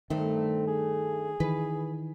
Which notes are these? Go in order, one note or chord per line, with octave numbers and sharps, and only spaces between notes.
G2 D#3 A3 C4
G#4
D#3 E3 B4